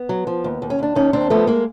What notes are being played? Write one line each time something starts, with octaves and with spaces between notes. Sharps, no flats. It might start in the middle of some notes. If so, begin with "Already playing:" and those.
Already playing: B3
F#3
F3
D#2
D#2
C#4
D#2 D4
D#2 C#4 D#4
D#2 C4 D4
F3 A3 B3
G#3 A#3